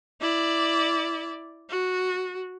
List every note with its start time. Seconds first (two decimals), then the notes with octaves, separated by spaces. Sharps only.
0.21 E4 D5
1.69 F#4